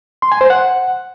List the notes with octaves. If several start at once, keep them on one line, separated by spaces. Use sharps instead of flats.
C6
G#5
C5
F#5